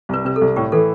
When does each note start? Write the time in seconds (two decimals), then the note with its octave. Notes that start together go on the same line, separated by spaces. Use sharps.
0.09 C2 B4
0.25 C3 B4
0.36 A4
0.41 C2
0.56 A2 G4
0.72 E3 A4